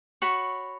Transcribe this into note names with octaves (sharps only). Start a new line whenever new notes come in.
F#4 C#5 B5